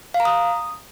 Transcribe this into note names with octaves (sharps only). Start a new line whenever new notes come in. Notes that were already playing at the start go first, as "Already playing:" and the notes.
F5
A#5
D#6